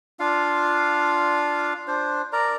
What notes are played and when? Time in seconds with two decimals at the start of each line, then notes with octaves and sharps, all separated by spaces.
0.20 D4 F4 F5
1.88 D4 C5
2.33 A#4 D5 A#5